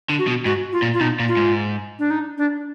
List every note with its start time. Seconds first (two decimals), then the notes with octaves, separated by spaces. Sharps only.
0.10 D3
0.19 F#4
0.28 B2
0.45 G#2 F#4
0.72 F4
0.82 A#2
0.94 F4
1.01 B2 D#4
1.19 A#2
1.28 F4
1.37 G#2
1.99 D4
2.10 D#4
2.38 D4